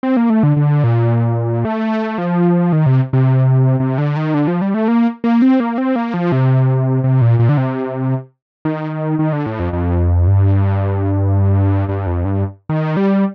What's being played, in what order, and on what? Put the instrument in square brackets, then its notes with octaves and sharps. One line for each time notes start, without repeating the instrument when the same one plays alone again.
[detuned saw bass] C4
A#3
A3
D3
D3
A#2
A3
F3
D#3
C3
C3
C3
D3
D#3
D3
F3
G3
A3
A#3
A#3
C4
A#3
C4
A#3
F3
C3
C3
A#2
A#2
D3
C3
D#3
D#3
D3
A2
F2
F2
G2
G2
F2
G2
D#3
G3